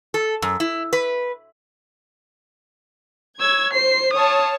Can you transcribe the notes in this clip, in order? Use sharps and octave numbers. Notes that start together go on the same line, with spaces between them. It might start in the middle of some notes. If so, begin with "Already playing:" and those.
A4
F#2
E4
B4
C#5 E6 G#6
C5 C7
C#5 F5 A5 D#6